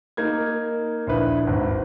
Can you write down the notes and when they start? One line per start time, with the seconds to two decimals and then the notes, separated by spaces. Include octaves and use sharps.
0.17 A#3 D#4 G#6
1.07 A#1 E4 B4
1.47 G#1